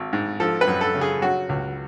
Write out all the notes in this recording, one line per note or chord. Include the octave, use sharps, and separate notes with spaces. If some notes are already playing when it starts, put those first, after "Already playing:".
Already playing: G#1
G#2
F3 A4
B4
F#2
A4
C#3
G#4
F#3 F#4
C#2